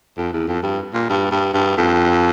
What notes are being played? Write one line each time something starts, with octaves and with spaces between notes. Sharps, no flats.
F2
E2
F2
G2
A#2
G2
G2
G2
F2